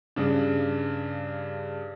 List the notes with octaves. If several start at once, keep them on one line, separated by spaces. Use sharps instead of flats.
G2 C#3 D4